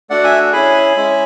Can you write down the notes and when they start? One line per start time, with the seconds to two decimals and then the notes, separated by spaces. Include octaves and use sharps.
0.10 A3 D4 F#4 D5 F#5
0.24 E5 G#5
0.52 C#4 E4 G#4 G#5 B5
0.96 G#3 C#4 E4